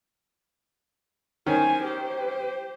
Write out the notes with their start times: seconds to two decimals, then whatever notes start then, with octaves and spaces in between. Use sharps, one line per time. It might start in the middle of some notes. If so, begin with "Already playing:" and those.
1.47 D#3 C#4 C5 G#5
1.83 G4 C5